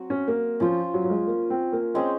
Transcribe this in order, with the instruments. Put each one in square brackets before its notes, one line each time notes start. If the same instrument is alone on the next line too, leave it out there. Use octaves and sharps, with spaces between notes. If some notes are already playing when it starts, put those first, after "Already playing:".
Already playing: [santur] F#3 C4 F#4
[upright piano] C#4
A#3
[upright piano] F3 [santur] C#4 F4 C5
[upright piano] F#3
F#3
G#3
A#3
C4
A#3
[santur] G#3 C#4 G#4 C5 [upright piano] C4